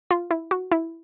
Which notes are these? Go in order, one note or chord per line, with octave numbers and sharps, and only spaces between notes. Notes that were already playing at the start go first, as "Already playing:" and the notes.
F4
E4
F#4
E4